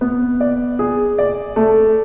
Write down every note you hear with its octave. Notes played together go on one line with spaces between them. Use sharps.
B3
D5
G#4
D5
A3